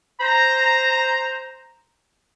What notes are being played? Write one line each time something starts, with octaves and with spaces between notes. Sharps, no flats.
C5 A#5